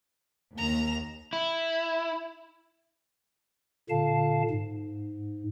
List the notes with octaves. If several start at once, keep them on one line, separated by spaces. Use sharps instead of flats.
D#2 A#5 E7
E4
A#2 D3 F5 A5
G#2